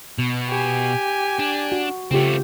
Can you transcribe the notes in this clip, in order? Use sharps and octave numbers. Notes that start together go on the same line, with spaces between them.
B2
G4 G#5
D4
F#4
C#3 A3 C4 F4 G4